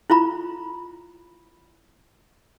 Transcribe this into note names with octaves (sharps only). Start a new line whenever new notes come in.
E4 F4 A#5 B5